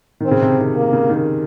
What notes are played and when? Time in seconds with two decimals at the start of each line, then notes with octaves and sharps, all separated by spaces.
0.20 D#3 C4
0.31 C#3
0.41 C3
0.59 D#3
0.77 A#3
0.93 C#3
1.09 D#3